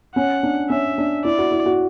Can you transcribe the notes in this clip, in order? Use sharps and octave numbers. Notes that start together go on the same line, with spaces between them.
C#4 F#5
D4
C#4 E5
D4
E4 D5
F#4
E4
F#4